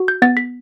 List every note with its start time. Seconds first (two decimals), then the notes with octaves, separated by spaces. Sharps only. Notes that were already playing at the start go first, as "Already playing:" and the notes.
Already playing: F#4
0.08 G6
0.22 B3 A6
0.37 B6